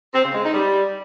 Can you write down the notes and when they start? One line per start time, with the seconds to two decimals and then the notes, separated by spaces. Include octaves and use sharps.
0.13 C4
0.23 C#3
0.33 G#3
0.43 D#4
0.53 G3